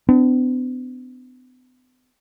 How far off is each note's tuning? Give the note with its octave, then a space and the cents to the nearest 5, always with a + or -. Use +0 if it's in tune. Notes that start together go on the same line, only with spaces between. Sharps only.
B3 +45 D4 +0